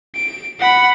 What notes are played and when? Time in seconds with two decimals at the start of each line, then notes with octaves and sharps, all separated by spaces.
0.15 D7
0.60 F#5 B5